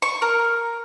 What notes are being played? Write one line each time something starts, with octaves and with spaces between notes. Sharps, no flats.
C#6
A#4